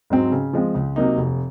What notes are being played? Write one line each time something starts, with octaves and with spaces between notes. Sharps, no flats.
G#2 F#3 C4
C#3
F3 G#3 C4
C#2
C3 F#3 A#3 D#4
F1